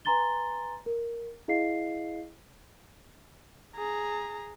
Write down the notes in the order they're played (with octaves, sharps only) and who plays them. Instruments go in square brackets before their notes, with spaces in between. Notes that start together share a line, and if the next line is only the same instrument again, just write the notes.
[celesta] B4 G#5 A#5 C6 A6 G7
A#4
E4 G#4 D#5 F5 C7
[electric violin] G#4 A#5